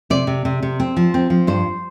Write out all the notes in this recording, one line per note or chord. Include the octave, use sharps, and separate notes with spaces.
C3 D5
C3
C3
C3
C4
F3
C4
F3
G2 C5